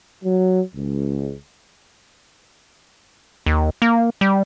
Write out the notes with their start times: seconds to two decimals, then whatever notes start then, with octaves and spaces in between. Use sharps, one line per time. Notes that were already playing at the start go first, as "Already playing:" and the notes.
0.24 F#3
0.75 C#2
3.46 D#2
3.82 A#3
4.21 G3